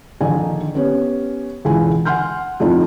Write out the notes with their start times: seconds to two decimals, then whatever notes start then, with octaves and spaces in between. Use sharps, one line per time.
0.21 A#1 D3 D#3 D#4 G#5
0.75 B3 C#4 G4 C#5
1.65 E1 C#2 D3 E3 G#5
2.05 F#5 G#5 C6 F6 G6
2.60 F2 A2 F3 D#4